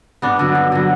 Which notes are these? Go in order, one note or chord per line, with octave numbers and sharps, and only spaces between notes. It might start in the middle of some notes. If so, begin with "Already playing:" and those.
G2 B3 D4
D3 F#3
G2
D3 F#3